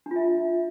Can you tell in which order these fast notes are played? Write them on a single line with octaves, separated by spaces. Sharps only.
D4 F4 E5